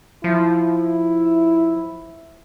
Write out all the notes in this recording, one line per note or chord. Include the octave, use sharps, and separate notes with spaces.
F3 E4